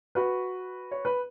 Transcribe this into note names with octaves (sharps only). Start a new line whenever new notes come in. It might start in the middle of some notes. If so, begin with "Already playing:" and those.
F#4 B4
C#5
B4